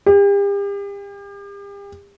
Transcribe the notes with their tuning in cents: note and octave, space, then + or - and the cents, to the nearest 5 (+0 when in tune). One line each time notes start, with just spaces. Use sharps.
G4 +40